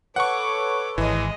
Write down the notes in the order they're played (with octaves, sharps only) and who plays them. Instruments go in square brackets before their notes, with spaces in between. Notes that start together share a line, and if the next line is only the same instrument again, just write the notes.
[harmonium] A4 B4 C#5 [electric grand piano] F#5 C#6 [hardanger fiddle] D6
[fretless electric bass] G#1 [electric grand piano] E3 [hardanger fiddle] G#3 D#5